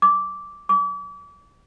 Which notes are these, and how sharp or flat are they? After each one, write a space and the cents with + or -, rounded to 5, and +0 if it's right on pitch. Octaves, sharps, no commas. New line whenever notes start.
D6 -10
D6 -40